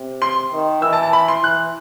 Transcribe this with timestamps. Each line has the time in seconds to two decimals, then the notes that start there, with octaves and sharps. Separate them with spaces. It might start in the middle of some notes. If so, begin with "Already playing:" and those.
Already playing: C3
0.22 C6
0.53 D#3
0.82 E3 E6
0.93 A5
1.03 A5
1.13 B5
1.28 C6
1.43 E3 F#6